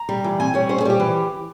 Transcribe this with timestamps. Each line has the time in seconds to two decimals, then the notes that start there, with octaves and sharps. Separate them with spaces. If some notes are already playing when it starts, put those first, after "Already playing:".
Already playing: A#5
0.09 G3
0.24 E3
0.40 C4 G#5
0.54 G3 C#5
0.69 C#4 C5
0.81 G#4
0.85 G3 G4
1.00 E3